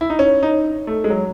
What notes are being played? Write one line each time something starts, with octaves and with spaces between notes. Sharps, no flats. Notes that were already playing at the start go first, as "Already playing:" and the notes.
E4
D#4
C#4
D#4
A3
G#3
F#3